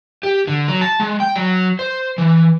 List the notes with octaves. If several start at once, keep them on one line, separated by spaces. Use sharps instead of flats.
G4
D3
F#3
A5
G#3
G5
F#3
C5
E3